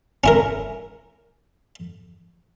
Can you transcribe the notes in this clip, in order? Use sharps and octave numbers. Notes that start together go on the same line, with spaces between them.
C#4 E4 A#4